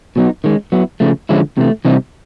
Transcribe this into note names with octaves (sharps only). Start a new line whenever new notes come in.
B2 F#3 B3 D#4
D#3 G#3 C#4
F#3 B3 E4
C#3 F3 A3
D3 F3 G#3 C#4 E4
C3 E3 A3
C3 E3 G3 C4 D#4